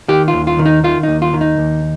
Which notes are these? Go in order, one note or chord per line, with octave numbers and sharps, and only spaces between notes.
D#3 G4
F4
D#2
F4
D#3
D#4
D#3 F4
D#4
D#2
F4
D#3
D#4
D#2